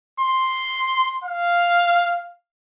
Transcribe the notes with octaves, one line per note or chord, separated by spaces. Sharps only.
C6
F5